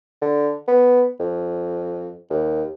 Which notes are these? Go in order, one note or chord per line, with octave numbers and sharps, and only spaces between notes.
D3
B3
F2
D#2